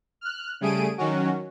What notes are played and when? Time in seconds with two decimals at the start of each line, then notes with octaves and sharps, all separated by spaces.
0.21 F6 F#6
0.61 C#3 G3 A3 G#4 D7 D#7
0.98 D#3 F#3 C#4 F#4